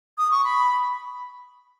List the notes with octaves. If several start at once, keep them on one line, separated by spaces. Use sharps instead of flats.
D#6
C#6
B5